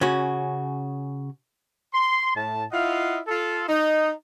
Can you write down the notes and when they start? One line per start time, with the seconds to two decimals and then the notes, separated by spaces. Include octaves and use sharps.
0.01 C#3 C#4 F#4
1.93 C6
2.36 A2 A5
2.72 E4 F4 D#5 F5 F#5
3.27 F4 A4
3.69 D#4